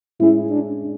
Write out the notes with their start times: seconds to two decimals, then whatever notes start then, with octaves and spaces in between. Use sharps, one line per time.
0.20 A2 G#3 C#4 E4 G#4
0.51 D4